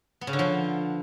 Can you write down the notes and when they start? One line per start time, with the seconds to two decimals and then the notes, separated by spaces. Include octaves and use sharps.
0.21 B3
0.27 C#3
0.33 D3
0.39 F3